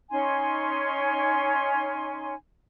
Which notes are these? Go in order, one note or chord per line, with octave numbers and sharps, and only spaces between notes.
C#4 D#4 G#5 C6